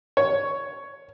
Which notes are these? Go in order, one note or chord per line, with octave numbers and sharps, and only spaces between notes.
C#5